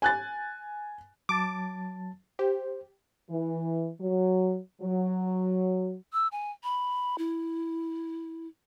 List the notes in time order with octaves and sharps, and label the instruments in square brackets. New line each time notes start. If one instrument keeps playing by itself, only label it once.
[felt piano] G#5 F#6 A6
[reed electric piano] F#3 A5 A6 [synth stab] D6
[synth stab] G4 [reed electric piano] C5
[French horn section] E3
F#3
F#3
[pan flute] E6
G#5
B5
E4